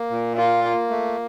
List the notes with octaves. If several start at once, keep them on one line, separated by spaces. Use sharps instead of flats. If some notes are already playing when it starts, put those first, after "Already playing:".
Already playing: A#3
A#2
A#3 F4
A#3
A3